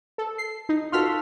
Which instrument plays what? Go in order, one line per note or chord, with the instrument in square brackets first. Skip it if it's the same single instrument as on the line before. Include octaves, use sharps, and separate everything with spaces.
[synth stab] A4
C7
D#4
[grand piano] F4 F#4 A4 [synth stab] C6 F6 B6